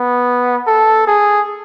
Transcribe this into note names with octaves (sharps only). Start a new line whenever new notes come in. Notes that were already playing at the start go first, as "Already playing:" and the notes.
Already playing: B3
A4
G#4